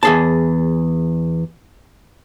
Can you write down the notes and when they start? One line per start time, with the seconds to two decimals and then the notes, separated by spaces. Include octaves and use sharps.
0.03 E2 G#4 A5